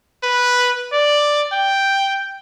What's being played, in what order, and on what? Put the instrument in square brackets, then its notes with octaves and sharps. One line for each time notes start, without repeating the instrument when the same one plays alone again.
[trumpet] B4
D5
G5